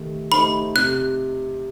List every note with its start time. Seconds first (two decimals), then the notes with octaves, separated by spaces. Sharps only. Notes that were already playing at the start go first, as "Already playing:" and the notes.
Already playing: D#3 A3 D#4 G4
0.32 A3 D#4 G4 C5 B5
0.75 C3 F#6